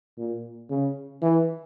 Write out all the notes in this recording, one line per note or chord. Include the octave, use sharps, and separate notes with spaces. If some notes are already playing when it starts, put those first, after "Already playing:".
A#2
C#3
E3